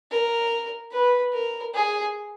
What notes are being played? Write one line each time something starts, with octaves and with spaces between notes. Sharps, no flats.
A#4
B4
A#4
G#4